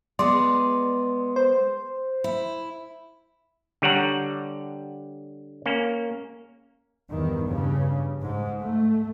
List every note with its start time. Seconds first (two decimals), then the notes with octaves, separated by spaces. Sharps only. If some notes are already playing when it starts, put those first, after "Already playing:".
0.19 G#3 B3 D5 C6
1.36 C5
2.24 E4
3.82 D3 G3 C#5 F#5 A#5
5.66 A#3 C#4
7.10 E2 G2 D#3
7.45 G2 C#3
8.23 G#2
8.61 A3